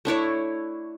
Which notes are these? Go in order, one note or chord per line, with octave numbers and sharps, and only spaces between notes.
A3 D4 E4 C#5